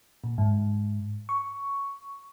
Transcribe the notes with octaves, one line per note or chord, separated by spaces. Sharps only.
A#2
G#2
C#6